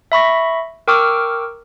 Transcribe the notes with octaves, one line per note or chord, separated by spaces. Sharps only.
E5 B5 C#6 A#6
A#4 G5 C#6 D6 E6 F6